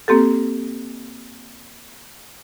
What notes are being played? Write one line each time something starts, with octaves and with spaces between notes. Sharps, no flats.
A#3 C4 G4 A4